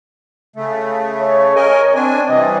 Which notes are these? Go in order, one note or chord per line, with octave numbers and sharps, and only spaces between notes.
C#3 A3
C#5
A#4 D#5 G#5
C4 D4 G#5
C3 E3 G3 D#5